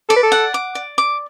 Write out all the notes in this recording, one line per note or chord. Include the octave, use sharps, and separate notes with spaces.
A4 D5
B4
A4
F#5
D6
D5
D6